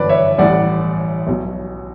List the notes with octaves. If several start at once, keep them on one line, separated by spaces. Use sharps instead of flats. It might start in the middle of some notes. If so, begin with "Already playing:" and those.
Already playing: G1 F#2 E3 G3 B4 D5
C#5 E5
A1 A2 G3 D5 F#5
B1 B2 F#3